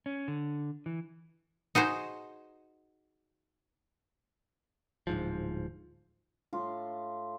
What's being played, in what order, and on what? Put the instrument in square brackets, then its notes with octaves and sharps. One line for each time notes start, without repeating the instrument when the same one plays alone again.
[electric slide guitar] C#4
D3
E3
[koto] D#4 F#4 G#4 C5
[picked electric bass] D1 G#2 F3
[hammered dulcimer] A2 F4 D6